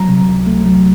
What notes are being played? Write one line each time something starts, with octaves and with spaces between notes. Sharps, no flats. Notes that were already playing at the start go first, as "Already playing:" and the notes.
Already playing: F#3 A#5
C3
C#2
A3
F#3